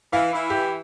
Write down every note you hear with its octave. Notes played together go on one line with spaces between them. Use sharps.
E3 F5
E3 E4
G4